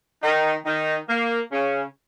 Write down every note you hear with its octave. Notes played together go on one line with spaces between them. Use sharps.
D#3 D#4
D#3 D#4
A#3
C#3 C#4